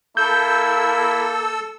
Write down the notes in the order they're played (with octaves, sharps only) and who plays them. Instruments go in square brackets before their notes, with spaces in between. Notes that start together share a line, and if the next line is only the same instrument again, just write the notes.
[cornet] A#3 [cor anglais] E4 [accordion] A4 E6 [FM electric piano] G6